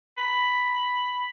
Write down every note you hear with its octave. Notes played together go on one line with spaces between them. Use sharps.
B5